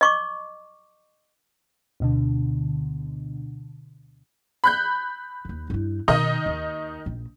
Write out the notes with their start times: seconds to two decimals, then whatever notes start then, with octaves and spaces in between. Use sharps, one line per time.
0.01 D#5 C#6 D6
2.00 D2 B2 D3
4.64 B5 F#6 G6
5.45 D#2 D#3
5.70 G2 E4
6.08 B2 D#3 B3 D#4 D#5
6.46 D#2
7.06 A#1